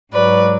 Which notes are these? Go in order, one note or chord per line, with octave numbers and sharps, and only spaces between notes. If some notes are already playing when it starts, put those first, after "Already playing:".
G#2 F#3 B4 D5